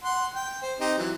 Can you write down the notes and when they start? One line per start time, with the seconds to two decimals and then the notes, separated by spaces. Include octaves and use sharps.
0.04 F#5 C6
0.35 G5
0.62 C5
0.80 C4 D#4 G4
0.98 E3 F#3